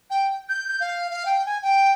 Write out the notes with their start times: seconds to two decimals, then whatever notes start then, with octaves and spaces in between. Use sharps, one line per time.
0.10 G5
0.49 G6
0.68 G6
0.80 F5
1.11 F5
1.26 G5
1.46 G#5
1.62 G5